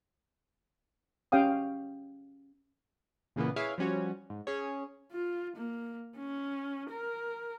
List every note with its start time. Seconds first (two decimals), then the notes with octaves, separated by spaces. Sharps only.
1.32 C#4 G4 F5 G5 D#6
3.36 A#2 C#3 E3 A#3 B3
3.56 E4 G#4 B4 C#5 E5 F5
3.78 F3 G3 C#4 F#4 C#5
4.30 G#2
4.47 C#4 G#4 C#5
5.12 F4
5.56 A#3
6.17 C#4
6.91 A#4